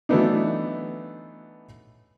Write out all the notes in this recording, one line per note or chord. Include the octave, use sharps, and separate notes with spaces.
E3 F#3 A3 B3 D4 D#4